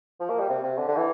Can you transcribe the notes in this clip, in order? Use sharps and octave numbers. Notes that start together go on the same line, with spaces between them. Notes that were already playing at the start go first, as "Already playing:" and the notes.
F3
A#3
G3
C3
C3
D3
D3
E3